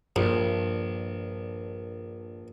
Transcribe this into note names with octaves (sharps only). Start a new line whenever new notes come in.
A#1 G2